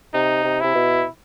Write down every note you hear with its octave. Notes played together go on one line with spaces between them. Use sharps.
C3 D#4
C3
C3 E4
B2